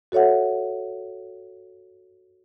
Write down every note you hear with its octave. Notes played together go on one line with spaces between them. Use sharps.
F#4 A4 C#5 E5 F#5